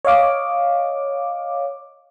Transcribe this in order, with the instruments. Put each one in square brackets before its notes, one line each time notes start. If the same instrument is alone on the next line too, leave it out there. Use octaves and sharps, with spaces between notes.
[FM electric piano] C#5 D#5 F5 D6